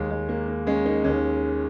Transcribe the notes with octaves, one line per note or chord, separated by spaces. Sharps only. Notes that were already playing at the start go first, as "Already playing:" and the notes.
Already playing: D#2 D#3 G#3
G#3
A#3
A#3
G#3 C#4
A#3 D#4
D#2 D#3 G#3 C#4